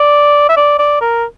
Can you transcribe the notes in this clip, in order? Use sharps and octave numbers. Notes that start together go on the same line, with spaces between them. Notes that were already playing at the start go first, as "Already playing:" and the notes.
Already playing: D5
E5
D5
D5
A#4